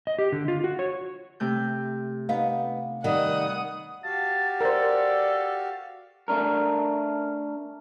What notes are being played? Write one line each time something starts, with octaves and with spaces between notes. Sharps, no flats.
D#5
G4
D3
F4
F#4
C#5
C3 A3 G6
B3 D#4 F5
D#3 G3 F#5 D#6
F#4 G4 F5 A5
A4 A#4 C5 D5
A3 C#4 D4 A#4